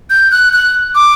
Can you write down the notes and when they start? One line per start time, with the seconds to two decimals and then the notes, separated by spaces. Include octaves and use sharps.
0.10 G6
0.31 F#6
0.53 F#6
0.95 D6